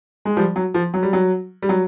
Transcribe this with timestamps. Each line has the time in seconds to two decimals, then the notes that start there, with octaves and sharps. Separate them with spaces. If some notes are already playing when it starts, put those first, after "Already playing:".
0.25 G#3
0.37 F3 G3
0.56 F#3
0.74 F3
0.94 F#3
1.03 G3
1.13 F#3
1.62 G3
1.69 F#3